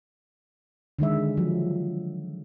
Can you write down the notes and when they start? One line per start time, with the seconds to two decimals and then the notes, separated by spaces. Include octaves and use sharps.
0.99 D3 D#3 G#3 E5
1.37 F3 F#3